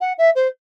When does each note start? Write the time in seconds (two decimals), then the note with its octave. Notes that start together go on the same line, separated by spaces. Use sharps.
0.01 F#5
0.18 E5
0.35 C5